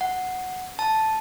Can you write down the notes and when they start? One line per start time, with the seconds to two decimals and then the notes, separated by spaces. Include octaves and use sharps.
0.01 F#5
0.79 A5